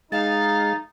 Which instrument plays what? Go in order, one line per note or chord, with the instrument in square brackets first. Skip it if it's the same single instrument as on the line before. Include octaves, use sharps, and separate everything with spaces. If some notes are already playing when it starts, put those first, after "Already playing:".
[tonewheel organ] G#3 [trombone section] D#4 [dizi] F5 [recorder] A6